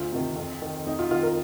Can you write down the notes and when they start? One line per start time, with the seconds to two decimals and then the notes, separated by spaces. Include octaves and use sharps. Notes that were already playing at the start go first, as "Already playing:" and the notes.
Already playing: D2 F4
0.12 C3 D#3
0.36 F2
0.62 D#3
0.86 F2 D#4
0.99 F4
1.11 D#3 F4
1.23 A#4